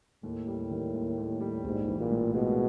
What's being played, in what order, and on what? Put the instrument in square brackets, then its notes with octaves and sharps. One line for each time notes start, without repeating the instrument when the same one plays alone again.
[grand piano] D#2 [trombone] A2
[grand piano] G3
D#3
D#2
D#2
G3
[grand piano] A#1 [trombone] G#2
[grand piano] E3
[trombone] A#2
[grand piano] A2
[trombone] B2 [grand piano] G#3